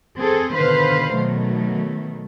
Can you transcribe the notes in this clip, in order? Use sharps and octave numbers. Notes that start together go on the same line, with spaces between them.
C4 G#4 A4
B2 D3 D#3 B4 C5 F5
B2 D#3 F#3 A3